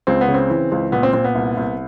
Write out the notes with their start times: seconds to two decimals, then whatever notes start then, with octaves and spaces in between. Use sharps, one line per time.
0.07 C#2 C4
0.21 B3
0.28 C#3
0.34 C4
0.50 E3
0.72 C#2
0.92 A#2 B3
1.03 C4
1.13 A#2 C4
1.24 B3
1.35 C2
1.57 C2